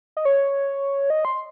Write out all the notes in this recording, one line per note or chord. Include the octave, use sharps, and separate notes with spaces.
D#5
C#5
D#5
C6